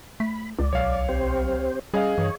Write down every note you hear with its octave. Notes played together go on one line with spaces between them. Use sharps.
A3 B5
C#2 D5
B1 C#5 F5
C4 G4 C5
G3 C#4 G#4 D#5 F5
G2 E3 C#5